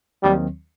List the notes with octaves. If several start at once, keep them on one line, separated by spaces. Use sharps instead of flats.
D#2 D#3 F#3 G3 C4